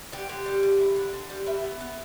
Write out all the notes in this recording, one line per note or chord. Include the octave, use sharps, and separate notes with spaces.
D3 G4
D3
G3
D3
E4
D3
D3
G3
B3 E5
B3
B3